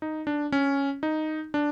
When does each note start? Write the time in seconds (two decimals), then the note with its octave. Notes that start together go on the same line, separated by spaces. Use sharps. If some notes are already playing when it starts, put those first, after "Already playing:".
0.02 D#4
0.27 D4
0.52 C#4
1.03 D#4
1.54 D4